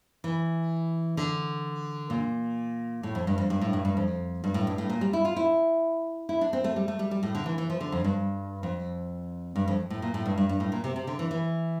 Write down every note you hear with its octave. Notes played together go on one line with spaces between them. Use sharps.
E3
D3
A#2
A2
F2
G2
F2
G2
A2
G2
G2
F2
G2
A2
G2
A2
A#2
G3
E4
F4
E4
E4
D4
C4
A3
G3
A3
G3
G3
A2
D3
E3
E3
F3
D3
F2
G2
F2
G2
F2
A2
A#2
A2
G2
G2
G2
A2
A#2
C3
C3
D3
E3
E3